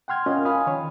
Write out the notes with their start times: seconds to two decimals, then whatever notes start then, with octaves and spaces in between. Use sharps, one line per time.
0.08 F#5 G5 C6 F6 G#6
0.26 C#4 F4 A#4 D#5 F5
0.45 F5 G#5 B5 D#6
0.67 D#3 C#5